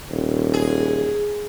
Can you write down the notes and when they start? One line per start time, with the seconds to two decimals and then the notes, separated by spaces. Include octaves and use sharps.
0.10 D#1
0.54 G#4